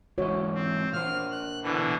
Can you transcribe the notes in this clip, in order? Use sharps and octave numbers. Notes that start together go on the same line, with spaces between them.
G#2 E3 F#4 C#5 D#5
C4
A#2 C5 F6
F#6
B2 D3 E3